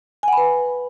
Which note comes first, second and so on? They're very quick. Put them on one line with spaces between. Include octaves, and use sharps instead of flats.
G#5 F#5 B5 B4